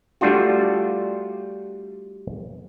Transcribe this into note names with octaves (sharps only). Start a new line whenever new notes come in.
G3 A3 D4 F4 F#4